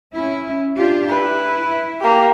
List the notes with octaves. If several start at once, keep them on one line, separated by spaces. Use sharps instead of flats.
C#4 E4
D4 F4 G4
E4 B4
A#3 G4